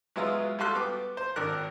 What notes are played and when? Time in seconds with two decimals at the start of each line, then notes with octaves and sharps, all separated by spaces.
0.16 F#3 G#3 B3 E4 F4
0.59 G3 F4 F#4 A4 C6 F#6
0.75 B3 D6
1.17 C5
1.36 G#1 D4 A#4 F#6